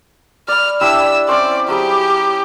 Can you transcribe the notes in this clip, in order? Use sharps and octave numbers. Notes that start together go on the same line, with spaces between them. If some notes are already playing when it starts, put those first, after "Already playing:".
D5 B5 F6
D4 E4 G4 E6
C4 C#4 C5 D5
F#3 G4 G#4 B5